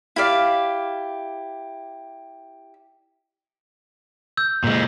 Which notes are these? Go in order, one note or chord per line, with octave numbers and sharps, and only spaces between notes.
E4 G4 D5 F5
E6 G6
A#2 G#3